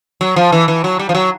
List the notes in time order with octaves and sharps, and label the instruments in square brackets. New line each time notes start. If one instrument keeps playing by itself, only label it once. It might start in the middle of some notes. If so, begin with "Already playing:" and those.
[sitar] F#3
F3
E3
E3
F#3
G3
F3
F#3